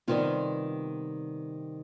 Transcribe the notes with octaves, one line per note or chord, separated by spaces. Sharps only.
C3 D#3 G3 B3 F4